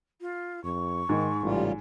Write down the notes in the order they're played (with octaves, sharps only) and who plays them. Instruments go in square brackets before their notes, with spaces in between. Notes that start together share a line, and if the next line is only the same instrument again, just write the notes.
[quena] F4
[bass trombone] F2 [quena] C#6
[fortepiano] G#2 [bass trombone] D#3
[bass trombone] A1 [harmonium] C#3 G3 F4